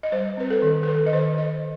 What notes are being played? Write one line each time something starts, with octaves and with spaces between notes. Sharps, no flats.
D#5
G3 C5
C4 B4
A4
D#3
A4
D#3 B4
D#5
D#3 C5
D#3 D#5